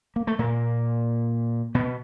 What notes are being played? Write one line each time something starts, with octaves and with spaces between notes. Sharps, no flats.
A#3
A3
A#2 A#3
B2 B3